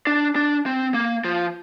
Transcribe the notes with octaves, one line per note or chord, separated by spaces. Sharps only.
D4
D4
C4
A#3
F3